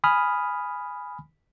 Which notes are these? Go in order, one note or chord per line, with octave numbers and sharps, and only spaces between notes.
G#5 B5 D#6 F6